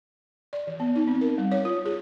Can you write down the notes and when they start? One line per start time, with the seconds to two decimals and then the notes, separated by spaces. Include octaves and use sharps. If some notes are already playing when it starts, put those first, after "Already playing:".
0.53 D5
0.67 E3
0.80 B3
0.96 D#4
1.07 C4
1.21 A#4
1.38 G3
1.52 C#5
1.65 F4
1.85 G#4